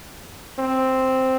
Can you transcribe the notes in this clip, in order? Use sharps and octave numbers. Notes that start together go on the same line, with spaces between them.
C4